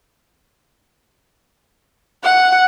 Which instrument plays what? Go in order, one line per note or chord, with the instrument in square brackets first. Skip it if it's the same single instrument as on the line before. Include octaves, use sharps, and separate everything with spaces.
[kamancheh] F#5